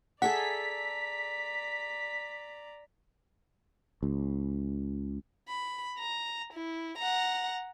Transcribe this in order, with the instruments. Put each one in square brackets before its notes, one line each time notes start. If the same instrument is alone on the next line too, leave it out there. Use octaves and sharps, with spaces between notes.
[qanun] G#4 A4 E5 [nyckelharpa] D5 A#5 [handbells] F#5 [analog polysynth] B6
[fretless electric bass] C#2
[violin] B5
A#5
E4
F#5 A#5